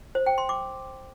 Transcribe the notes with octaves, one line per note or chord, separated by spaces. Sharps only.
C5
G5
C6
D6